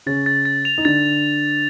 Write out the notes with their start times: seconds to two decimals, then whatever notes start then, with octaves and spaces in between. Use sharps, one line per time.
0.06 C#3 C#4 A6
0.26 A6
0.45 A6
0.65 F7
0.78 D#4
0.85 D3 D4 A6